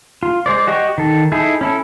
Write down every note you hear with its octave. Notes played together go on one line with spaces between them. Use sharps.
F4
G#3 C5 D5
F#4 G4 D#5 G5 C#6
D#3 A4
D#4 E4 G#4 A4
C#4 E4 A4